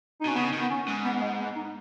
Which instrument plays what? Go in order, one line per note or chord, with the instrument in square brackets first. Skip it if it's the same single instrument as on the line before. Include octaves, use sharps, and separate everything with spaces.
[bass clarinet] D#4
[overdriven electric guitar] B2 [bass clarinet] C#4
[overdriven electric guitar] C#3 [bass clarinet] B3
[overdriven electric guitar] D#3
[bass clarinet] B3
C#4
[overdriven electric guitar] G#2
[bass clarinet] B3
B3
G#3
B3
D#4